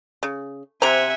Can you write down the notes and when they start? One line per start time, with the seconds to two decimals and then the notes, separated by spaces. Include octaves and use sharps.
0.23 C#3
0.82 C3 C5 E5 F#5 G#5 A#5